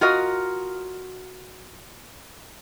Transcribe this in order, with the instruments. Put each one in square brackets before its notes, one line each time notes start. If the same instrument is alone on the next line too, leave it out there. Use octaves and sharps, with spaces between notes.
[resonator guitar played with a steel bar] F4 F#4 A#4 D#5